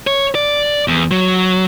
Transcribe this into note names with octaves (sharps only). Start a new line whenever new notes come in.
C#5
D5
E2
F#3